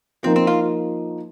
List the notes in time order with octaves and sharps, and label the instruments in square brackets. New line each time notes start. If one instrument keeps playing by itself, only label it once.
[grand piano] F3 A#3 D#4 [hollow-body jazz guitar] C4
[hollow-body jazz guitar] C4
F4